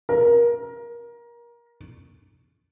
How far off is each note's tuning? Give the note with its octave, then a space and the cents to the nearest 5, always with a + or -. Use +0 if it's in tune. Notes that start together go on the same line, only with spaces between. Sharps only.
A#4 +25